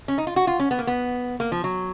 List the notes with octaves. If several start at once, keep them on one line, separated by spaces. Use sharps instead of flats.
C#4
D#4
F4
F#4
F4
C#4
B3
A#3
B3
A#3
F3
F#3